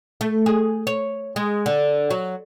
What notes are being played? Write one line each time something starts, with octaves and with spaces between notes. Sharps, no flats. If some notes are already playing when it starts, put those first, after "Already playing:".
A3
G#4
C#5
G#3
D3
F#3